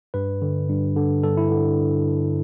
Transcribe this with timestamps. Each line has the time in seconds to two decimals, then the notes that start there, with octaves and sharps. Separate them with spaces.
0.14 G2 B4
0.42 D3
0.69 G2
0.97 D3
1.24 G2 A4
1.37 E4
1.51 D3